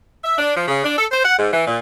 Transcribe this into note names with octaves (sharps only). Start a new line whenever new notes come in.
E5
D4
F3
C#3
D4
A4
C5
F#5
G#2
E3
A#2